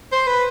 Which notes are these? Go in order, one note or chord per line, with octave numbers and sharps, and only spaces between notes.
C5
B4